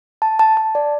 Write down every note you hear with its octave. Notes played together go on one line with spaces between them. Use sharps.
A5
A5
A5
D5